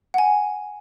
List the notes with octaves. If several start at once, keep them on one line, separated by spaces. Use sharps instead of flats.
F#5 G#5